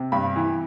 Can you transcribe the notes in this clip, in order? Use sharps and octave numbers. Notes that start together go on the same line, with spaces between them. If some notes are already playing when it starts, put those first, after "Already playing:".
Already playing: C3
G2 B5
E3